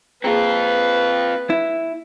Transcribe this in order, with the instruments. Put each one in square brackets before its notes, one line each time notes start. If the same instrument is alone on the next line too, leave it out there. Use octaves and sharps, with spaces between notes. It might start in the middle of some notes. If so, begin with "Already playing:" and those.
[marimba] A#3 G#4 [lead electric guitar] C4 F4 [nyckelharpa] B4
[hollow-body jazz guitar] E4